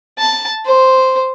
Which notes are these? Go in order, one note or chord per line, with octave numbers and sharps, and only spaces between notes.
A5
C5